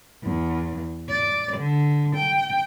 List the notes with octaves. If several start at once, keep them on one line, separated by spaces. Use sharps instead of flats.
E2
D5
D3
G5